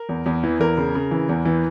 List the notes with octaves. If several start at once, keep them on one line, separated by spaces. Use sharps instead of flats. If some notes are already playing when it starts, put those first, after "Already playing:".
Already playing: A#4
E2
E2
E3
E2 A#4
C#3
C#3
E3
E2
E3